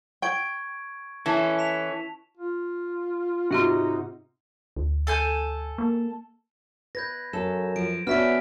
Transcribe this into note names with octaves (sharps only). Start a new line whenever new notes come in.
G5 C#6 G#6 D7
E3 C#4 A4 A5
B6 E7 F7
F4
G#2 C3 C4 D#4 F4 F#4
D2
A4 G#5 G6
A#3
B4 G6 G#6 A#6
F#2 A4 E7
F3 D7
B3 C#4 D4 F#4 E5 F6 B6 D7